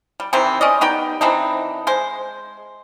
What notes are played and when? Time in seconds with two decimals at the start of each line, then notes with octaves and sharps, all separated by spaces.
0.20 G3
0.33 C3 D#3 E3 C4
0.61 C#4 D5 D#5
0.81 B3 D#4 G4 G5
1.21 E3 C4 D4 D#4
1.87 G#3 C5